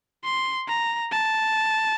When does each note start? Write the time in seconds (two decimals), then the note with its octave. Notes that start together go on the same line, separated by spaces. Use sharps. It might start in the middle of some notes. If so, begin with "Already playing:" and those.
0.24 C6
0.68 A#5
1.12 A5